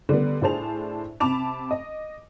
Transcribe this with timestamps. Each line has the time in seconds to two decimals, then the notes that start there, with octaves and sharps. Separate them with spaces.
0.09 D3 G3 B3
0.42 A2 D4 G#4 C5 A5 F7
1.20 C3 A5 B5 D6 F7
1.71 D#5